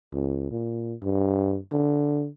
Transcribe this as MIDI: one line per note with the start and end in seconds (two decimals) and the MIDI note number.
0.12 0.47 37
0.51 0.94 46
1.02 1.58 43
1.72 2.28 50